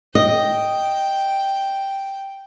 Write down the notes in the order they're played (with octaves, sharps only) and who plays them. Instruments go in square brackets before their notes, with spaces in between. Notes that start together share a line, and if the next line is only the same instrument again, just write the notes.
[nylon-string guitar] D#5 [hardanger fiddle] G5